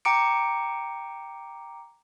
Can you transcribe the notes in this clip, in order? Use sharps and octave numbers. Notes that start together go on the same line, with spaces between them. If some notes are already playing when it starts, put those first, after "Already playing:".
G5 A#5 D6 C#7 D7